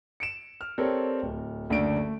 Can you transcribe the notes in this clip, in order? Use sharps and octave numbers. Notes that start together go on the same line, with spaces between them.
C#7 D7 E7
F6
C4 G4 A4 A#4 C#5 D5
D1
F#1 D2 A3 D4 D7
A3